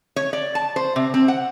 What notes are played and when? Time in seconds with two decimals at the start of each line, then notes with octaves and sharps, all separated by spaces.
0.16 C#5
0.33 D5
0.55 A5
0.76 C5
0.96 C3
1.14 C4
1.28 F#5